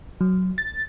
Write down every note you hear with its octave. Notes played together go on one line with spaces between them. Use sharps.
F#3
A6